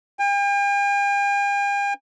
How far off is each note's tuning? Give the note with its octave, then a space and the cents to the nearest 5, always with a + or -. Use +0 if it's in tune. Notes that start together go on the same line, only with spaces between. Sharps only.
G5 +45